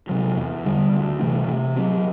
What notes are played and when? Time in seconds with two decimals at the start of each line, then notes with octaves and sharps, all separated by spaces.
0.09 C3 F#3
0.37 E2
0.65 D3 G3
0.93 D2
1.21 C3 E3 A3
1.48 C3
1.76 F#3 C4